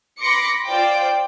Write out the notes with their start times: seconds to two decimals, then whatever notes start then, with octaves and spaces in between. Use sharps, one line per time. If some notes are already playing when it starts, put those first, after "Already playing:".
0.20 B5 C6 D6 A#6 C#7
0.65 F4 C5 D5 G5 D6